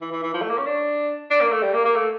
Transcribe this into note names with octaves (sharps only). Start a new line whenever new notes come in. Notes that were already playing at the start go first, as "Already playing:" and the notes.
E3
E3
E3
F3
A3
A#3
C#4
D4
D4
A#3
A3
G3
A#3
A#3
A3